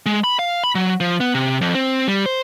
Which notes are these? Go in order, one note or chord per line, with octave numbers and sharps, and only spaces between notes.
G#3
B5
F5
B5
F#3
F3
B3
C3
F2
C4
G3
C5